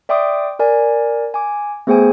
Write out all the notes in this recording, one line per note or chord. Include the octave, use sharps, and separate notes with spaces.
D5 E5 G5 C6 D6 D#6
A#4 D5 G#5
G#5 D6
A3 B3 G#4 C5 G5 G#5